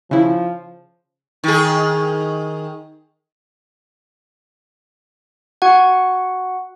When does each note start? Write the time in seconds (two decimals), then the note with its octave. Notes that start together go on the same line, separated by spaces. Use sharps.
0.11 C#3 F3 E4
1.44 D#3 G#4
5.62 F#4 F#5